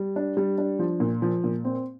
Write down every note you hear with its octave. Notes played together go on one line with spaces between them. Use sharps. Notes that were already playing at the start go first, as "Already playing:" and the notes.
Already playing: G3
D4
G3
D4
F3
A#2
F3
A#2
C4